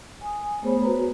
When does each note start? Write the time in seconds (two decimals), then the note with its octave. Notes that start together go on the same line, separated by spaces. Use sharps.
0.21 G#5 D#6
0.62 A3 B3 G#4 C5 C#5 B5
0.83 F#4 B4 A#5